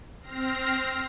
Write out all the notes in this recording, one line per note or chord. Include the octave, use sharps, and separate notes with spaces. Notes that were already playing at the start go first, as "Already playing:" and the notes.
C4 F6 A#6 C7